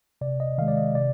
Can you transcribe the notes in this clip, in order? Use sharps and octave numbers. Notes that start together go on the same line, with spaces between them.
C3 D5
D#5
D#3 G#3 F5
D5
D#5
C3 D5